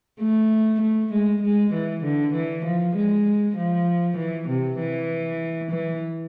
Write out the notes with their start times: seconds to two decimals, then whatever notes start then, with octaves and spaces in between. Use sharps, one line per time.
0.20 A3
0.81 A3
1.12 G#3
1.42 G#3
1.73 E3
2.04 D3
2.34 E3
2.65 F3
2.96 G#3
3.57 F3
4.17 E3
4.48 C3
4.78 E3
5.71 E3